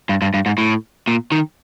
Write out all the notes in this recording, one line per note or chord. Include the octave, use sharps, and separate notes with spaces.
G2
G2
G2
G#2
A2
A#2
D#3